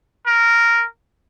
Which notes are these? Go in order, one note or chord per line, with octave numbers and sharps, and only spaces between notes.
A#4